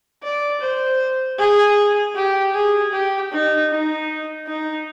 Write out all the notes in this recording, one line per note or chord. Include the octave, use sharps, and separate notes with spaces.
D5
C5
G#4
G4
G#4
G4
D#4
D#4
D#4